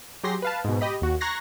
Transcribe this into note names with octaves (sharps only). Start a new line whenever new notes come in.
F#3 G4 G#4 C6 A#6 C7
B4 F5 A5
G#2 B2
G4 D#5 B5
D#2 F#4
A#5 C#6 F#6 G#6 A#6 C7